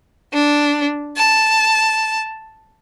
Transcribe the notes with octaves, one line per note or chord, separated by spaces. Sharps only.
D4
A5